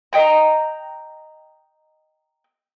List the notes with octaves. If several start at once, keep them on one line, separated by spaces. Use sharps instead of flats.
D#5 G5 A#5